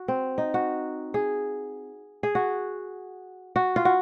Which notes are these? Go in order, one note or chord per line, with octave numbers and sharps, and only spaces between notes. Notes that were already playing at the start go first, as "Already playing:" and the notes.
Already playing: F#4
C4
D#4
F#4
G#4
G#4
F#4
F#4
F4
F#4